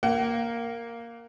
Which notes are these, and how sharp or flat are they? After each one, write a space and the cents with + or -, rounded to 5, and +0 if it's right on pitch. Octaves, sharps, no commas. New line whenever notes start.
A#3 +0 F#5 +40